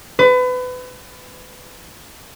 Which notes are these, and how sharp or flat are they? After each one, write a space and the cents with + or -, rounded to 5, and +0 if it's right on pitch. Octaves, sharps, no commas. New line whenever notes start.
B4 +30